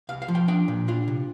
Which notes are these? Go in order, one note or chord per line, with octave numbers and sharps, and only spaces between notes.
C2 F5
F5
F3
G5
D4 G5
A#2
D4 F4
C3